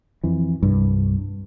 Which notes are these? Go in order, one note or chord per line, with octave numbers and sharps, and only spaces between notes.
F2 E3
C2 G2